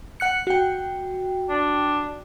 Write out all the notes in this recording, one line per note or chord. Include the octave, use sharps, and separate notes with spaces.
F#5 F#6 C#7
F#4 G5
D4